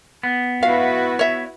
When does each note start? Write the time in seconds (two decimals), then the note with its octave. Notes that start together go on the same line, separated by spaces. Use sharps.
0.23 B3
0.63 E4 F#4 B4 F5
1.19 C#5 E5